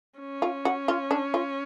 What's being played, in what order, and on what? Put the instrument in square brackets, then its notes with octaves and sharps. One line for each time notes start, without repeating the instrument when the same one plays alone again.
[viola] C#4
[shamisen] F4
F#4
F4
D4
F4